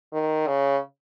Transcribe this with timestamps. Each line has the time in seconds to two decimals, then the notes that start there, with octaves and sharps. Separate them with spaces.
0.13 D#3
0.47 C#3